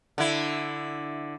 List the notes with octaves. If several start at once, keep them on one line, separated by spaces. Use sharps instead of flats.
D3 E4